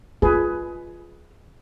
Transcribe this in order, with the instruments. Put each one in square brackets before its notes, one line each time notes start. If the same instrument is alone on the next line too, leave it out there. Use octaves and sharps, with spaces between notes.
[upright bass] F4 [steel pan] G#4 B4